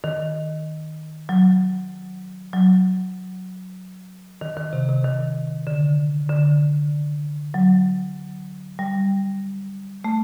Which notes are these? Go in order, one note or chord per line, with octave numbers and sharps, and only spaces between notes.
D#3
F#3
F#3
D#3
D#3
C3
C3
D#3
D3
D3
F#3
G3
A3